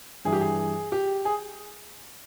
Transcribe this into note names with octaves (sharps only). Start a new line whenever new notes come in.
G2 E3 G#4
G4
G#4
G4
G#4